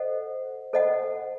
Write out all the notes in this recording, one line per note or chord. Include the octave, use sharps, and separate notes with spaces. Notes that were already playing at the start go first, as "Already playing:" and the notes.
Already playing: A4 C5 D#5 F#5
A4 C5 D#5 F#5